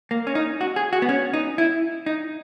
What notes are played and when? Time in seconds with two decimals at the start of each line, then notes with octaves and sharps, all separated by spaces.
0.11 A#3
0.27 C#4
0.35 D#4
0.61 F#4
0.76 G#4
0.93 F#4
1.02 B3
1.09 C#4
1.34 D#4
1.58 E4
2.06 D#4